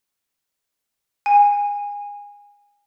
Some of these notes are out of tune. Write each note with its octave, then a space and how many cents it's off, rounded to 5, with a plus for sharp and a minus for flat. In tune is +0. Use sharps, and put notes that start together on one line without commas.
G#5 -25